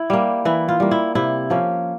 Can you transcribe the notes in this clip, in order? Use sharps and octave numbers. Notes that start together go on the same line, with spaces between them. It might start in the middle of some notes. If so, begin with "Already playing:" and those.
Already playing: E4
G3 A#3
E3 E4
F4
G3 A#3
E4
C3 E4
F3 A#3 C#4